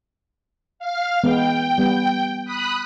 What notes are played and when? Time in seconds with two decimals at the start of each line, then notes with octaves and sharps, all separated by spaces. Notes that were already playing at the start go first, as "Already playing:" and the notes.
0.79 F5 F6
1.24 E3 G#3 B3 G5
1.78 G3 B3
2.45 B5 D#6 F#6